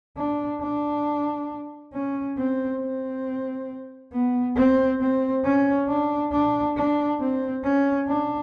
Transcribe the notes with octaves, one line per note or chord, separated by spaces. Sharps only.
D4
D4
C#4
C4
C4
B3
C4
C4
C#4
D4
D4
D4
C4
C#4
D4